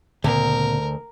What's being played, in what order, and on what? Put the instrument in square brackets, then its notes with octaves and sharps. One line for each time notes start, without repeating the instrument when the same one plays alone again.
[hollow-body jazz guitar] D2 [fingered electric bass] A#2 C#3 B3 [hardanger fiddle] A#4